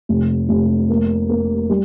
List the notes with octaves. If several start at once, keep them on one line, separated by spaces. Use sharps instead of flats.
F1
F1
A#3
A#3
G3